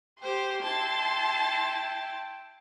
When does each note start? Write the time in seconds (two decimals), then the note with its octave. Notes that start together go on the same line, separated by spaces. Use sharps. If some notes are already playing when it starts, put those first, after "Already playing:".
0.22 G4 C5 G5 C6
0.63 E4 A5